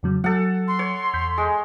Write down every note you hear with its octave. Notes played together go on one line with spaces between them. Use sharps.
F2 C#3 F#3
F#3 A4 F#5
C6
C#5
E2 G6 B6
G#3